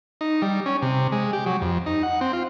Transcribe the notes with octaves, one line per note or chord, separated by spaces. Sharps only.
D#4
G3
C#4
C3
G#3
G4
F#3
F2
D#4
F#5
C4
F4